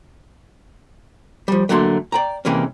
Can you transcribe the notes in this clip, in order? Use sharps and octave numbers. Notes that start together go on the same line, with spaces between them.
F3 G3
D3 F#3 A3 A#3 C6
D5 G5 A#5
C3 E3 G#3 A#3 C#4